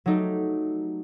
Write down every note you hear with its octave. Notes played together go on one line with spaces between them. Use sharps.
F#3 A3 D#4 G4